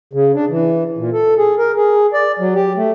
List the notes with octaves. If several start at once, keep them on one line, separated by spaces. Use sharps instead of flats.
C#3
D4
E3
A#2
A4
G#4
A#4
G#4
D5
F#3
G4
A3